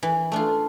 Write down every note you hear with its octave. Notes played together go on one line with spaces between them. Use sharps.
E3
A3 D4 F4